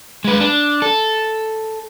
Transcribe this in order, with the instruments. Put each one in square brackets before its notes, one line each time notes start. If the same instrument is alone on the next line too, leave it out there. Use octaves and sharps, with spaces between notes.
[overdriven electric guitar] G#3 B4
D4
A4